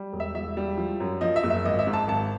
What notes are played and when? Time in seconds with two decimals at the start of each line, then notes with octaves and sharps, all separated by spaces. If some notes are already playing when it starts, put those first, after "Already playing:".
Already playing: G3
0.13 E1
0.20 E5
0.35 E1 E5
0.57 G3
0.78 F3
1.00 F#2
1.21 F3 D#5
1.36 E5
1.43 F#1
1.50 E5
1.65 G#1 D#5
1.79 E5
1.87 G#2
1.93 A5
2.08 G#1 A5